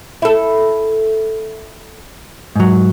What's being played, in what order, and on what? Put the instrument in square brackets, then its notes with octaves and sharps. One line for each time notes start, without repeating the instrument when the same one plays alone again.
[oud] E4 A4
[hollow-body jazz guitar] G#2 F#3